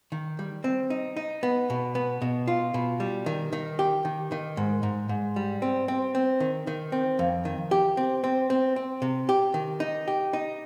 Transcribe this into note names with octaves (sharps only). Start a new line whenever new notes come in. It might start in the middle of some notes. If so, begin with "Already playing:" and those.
D#3
G3
C4
D#4
D#4
B3
B2
B3
B2
F4
B2
G3
D#3
D#3
G4
D#3
D#3
G#2
G#2
G#2
G3
C4
C4
C4
D#3
D#3
C4
F2
D#3
G4
C4
C4
C4
C4
C3
G4
D#3
D#4
G4
D#4